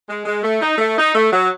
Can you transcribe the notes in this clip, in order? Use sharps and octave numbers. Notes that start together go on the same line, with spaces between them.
G#3
G#3
A3
D#4
A3
D#4
A3
F#3